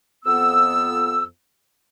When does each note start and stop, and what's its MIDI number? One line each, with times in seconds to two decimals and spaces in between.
0.24 1.24 41
0.24 1.24 59
0.24 1.24 88